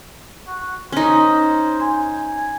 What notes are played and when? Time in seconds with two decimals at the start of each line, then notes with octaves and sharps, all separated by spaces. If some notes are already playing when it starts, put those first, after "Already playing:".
0.47 F#4
0.92 C#4 D#4 C5
1.81 G#5